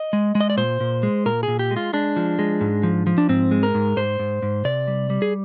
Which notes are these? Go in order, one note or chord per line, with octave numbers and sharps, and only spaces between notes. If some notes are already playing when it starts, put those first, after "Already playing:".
Already playing: D#5
G#3
G#3
D#5
D5
A#2 C5
A#2
G#3
A#2 A#4
G#4
A#2
G4
G#3
F4
G#3 D4
F3
G#3
G#2
F3
F3
D4
G#2 C4
G#3
A#4
G#2
G#2 C5
G#2
G#2
C3 D5
G3
G3
G#4